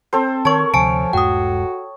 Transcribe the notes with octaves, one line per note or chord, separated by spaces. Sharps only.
C4 A4 C5
D#3 A#4 C#5 A5 C#6
D2 C3 F3 G#5 A5 D7
D#1 G2 G#3 F#4 G5 D#6